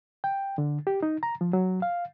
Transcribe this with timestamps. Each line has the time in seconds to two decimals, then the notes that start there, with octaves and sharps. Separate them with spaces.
0.24 G5
0.58 D3
0.87 G4
1.03 D#4
1.23 A#5
1.41 F3
1.53 F#3
1.82 F5